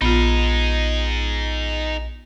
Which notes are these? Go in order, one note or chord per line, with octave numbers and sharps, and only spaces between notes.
A#1 B3 D#4 F4 G#4